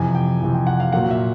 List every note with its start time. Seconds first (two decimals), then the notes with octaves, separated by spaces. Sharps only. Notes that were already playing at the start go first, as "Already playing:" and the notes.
Already playing: F2 C3 E3 G#5
0.15 G5
0.41 F2 C3 E3
0.55 G5
0.67 F#5
0.80 F5
0.93 A#2 F#3 A#3 F#5
1.11 E5